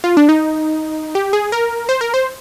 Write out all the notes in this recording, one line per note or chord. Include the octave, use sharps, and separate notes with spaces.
F4
D4
D#4
G4
G#4
A#4
C5
A#4
C5